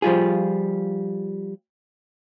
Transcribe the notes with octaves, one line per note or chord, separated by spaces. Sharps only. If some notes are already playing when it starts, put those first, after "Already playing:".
F3 G3 F4 G#4